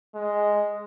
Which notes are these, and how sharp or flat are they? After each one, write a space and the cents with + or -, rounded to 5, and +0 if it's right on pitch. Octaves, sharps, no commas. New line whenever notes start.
G#3 +0